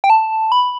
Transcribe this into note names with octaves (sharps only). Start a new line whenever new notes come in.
G5
A5
B5